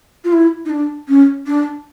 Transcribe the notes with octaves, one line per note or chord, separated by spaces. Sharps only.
F4
E4
D#4
D4
C#4
D4